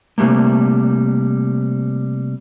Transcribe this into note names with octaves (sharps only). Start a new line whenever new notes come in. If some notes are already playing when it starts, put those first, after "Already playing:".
C3 F3 G3 A3 A#3